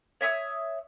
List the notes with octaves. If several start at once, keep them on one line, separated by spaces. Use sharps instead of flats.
C#5 E5 D#6 E6